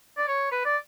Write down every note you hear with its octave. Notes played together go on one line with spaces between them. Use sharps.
D5
C#5
B4
D5